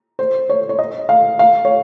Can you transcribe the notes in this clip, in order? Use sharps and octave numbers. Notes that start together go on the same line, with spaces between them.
C5
C#5
C#5
D#5
F5
F5
C#5